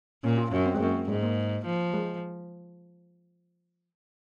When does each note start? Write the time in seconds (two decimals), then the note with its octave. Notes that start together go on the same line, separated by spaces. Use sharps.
0.24 A#2 C#4
0.38 F4
0.52 F#2 C#4
0.66 C4
0.75 G#3
0.80 F#2 A#3
1.08 G#2 G#3
1.23 A#3
1.66 F3
1.94 G#3